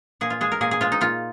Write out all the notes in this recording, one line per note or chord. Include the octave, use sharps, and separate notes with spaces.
A#2 G#4
F4
G#3 G#4
A#4
A#2 G#4
G#4
G#3 F4
D#4
A#2 F4